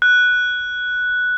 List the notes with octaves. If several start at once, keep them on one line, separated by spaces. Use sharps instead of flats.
F#6